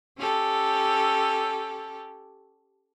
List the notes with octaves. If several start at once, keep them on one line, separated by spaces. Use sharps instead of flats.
C#4 G4 A4